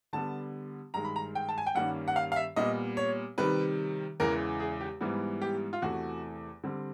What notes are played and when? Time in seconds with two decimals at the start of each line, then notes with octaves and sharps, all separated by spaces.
0.13 D3 G3 B3 A5
0.94 G2 D#3 G#3 A#5
1.05 B5
1.16 A#5
1.35 G5
1.49 A5
1.58 G#5
1.67 G5
1.75 G2 D#3 G3 A#3 C#4 F#5
2.08 F#5
2.16 F5
2.32 F5
2.36 E5
2.56 A#2 G3 B3 D#5
2.97 C#5
3.38 C3 D#3 G3 B4
4.20 E2 C#3 E3 G#3 A#4
4.60 G#4
4.81 G4
5.01 G#2 E3 G3 B3
5.42 G4
5.73 F4
5.82 E2 C3 E3 A3 F#4
6.64 D3 G3 C4